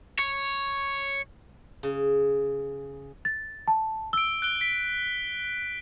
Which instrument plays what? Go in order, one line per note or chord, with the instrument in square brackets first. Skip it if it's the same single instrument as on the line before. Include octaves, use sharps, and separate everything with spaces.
[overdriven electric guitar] C#5
[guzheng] C#3
[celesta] A6
A5
[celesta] E6 [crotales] D7 G7
[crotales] F#6 D7 G7
B6 D7